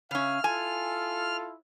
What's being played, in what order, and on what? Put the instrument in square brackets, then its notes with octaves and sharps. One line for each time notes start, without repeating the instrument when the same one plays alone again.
[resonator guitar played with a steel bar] C#3 C#4 [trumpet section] E5 F5 [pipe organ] F6
[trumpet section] E4 F4 A4 [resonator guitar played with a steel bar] G#5